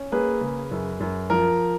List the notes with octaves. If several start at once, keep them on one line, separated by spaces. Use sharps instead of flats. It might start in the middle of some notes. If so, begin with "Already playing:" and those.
Already playing: C#4
A#3 G#4 B4
C#3
F#2
F#2
F3 A#4